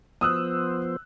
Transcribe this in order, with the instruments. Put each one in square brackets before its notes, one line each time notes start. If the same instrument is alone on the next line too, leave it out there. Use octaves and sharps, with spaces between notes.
[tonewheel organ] F3 B3 C5 [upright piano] D#6 E6 F#6